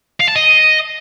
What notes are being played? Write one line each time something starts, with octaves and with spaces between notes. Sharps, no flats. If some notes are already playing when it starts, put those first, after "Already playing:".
F5
A5
D#5